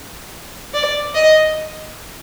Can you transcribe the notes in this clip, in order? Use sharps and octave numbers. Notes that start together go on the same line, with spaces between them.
D5
D#5